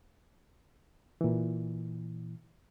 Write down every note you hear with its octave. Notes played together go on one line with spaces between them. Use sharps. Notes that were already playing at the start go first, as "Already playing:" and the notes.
A#2 E3